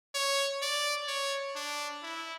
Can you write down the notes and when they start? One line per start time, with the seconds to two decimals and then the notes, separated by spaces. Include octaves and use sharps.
0.15 C#5
0.62 D5
1.08 C#5
1.56 D4
2.03 E4